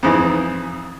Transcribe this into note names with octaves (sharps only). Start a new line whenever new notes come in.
F2 G#2 E3